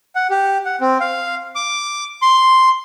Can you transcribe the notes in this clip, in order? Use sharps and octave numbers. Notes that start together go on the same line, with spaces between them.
F#5
G4
F#5
C4
F5
D6
C6